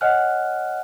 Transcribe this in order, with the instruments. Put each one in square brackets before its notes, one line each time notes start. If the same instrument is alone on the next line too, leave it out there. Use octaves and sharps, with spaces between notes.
[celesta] C#5 D#5 F#5 G#5 F6 F#6